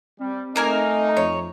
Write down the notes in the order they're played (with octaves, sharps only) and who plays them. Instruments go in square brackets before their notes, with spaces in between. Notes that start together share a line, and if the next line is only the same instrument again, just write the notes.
[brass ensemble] G3 [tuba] C4
[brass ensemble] A3 D#4 [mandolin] A#3 A#4 G#5
[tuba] F2 [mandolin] C#5